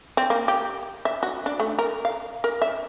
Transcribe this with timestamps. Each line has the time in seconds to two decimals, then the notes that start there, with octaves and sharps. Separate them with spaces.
0.17 C4
0.30 A#3
0.48 G4
1.05 E5
1.23 F#4
1.46 D4
1.60 A3
1.79 A#4
2.05 F5
2.44 A#4
2.62 E5